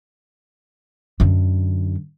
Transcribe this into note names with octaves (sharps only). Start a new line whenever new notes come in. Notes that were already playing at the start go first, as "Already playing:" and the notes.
F#2 D3